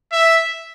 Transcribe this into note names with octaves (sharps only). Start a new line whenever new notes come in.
E5